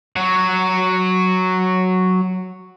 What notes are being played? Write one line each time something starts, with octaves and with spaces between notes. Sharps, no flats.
F#3 F#4